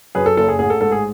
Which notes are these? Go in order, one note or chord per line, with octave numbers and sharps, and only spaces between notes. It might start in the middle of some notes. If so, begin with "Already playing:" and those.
F#2 G#4 B4
A4
F#1 A4
G#4
A1 G#4
A4
G#2 A4
G#4